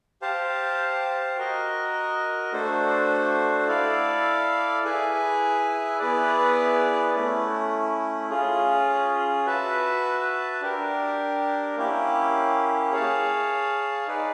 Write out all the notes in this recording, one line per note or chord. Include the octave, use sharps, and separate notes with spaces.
G4 C5 F5 A5
F#4 A#4 D#5
A3 D4 F#4 A4 C5
E4 A4 D5 F5
E4 G#4 B4 E5 G#5
B3 E4 G#4 B4 D5
A3 C#4 E4
C#4 F4 G#4
F#4 B4 E5 A5
D4 G4 A#4
A#3 C#4 E4 G4
G#4 C#5 F5 A5
D#4 G#4 B4 D5